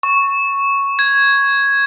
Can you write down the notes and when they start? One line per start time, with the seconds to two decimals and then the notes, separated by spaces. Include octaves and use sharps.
0.03 C#6
0.99 G#6